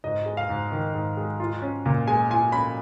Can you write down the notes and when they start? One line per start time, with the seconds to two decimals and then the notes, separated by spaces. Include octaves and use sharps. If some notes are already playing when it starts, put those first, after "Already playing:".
0.04 G#2 D#5
0.26 G#3
0.37 F5
0.49 G#2
0.72 D#3
0.94 G#2
1.17 G#3
1.40 F4
1.62 C#4
1.86 A#2
2.08 G#3 G#5
2.30 F4 G#5
2.52 C#4 B5